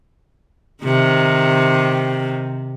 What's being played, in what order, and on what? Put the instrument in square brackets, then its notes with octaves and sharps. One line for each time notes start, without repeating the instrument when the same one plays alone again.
[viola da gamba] C3 D#3